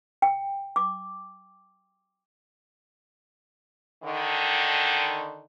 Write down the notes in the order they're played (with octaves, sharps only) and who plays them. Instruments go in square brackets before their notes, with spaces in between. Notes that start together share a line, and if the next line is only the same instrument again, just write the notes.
[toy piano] G5
D6
[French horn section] D3 D#3